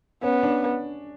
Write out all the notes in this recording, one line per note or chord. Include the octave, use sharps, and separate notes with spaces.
B3 C#4
D4